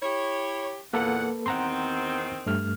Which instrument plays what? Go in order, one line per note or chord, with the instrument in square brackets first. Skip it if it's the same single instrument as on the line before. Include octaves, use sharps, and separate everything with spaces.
[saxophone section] E4 G4 C#5
[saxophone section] E2 A#2 F#5 [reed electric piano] A#3 A4 B4
[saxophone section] E2 D#3 C4 [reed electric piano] F#5 A#5 C6
[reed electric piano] G2 A3 F6